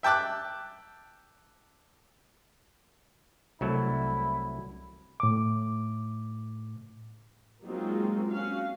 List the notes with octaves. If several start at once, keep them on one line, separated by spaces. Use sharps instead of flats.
E5 G5 A5 D6 F#6
C2 F#3 A3 E4
A2 D6
F#3 G#3 A#3 C4 D#4 F4
C#4 F#4 F5